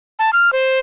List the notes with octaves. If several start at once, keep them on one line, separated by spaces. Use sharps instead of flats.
A5
F6
C5